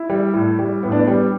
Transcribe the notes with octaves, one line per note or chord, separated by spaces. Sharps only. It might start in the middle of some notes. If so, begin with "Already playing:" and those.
Already playing: E4
G3
A2
G3
A2 B3
D4
B3
G3